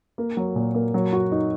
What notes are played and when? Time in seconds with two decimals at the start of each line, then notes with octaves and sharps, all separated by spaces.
0.18 A#3
0.37 F#3
0.56 A#2
0.74 A#3
0.94 F#3
1.12 F#4
1.32 D#4